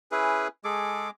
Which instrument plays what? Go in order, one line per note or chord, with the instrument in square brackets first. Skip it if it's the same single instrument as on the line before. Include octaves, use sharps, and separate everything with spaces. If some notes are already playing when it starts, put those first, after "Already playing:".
[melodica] C#4 E4 [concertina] G#4 B4
[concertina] G#3 D6 [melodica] G#4 A4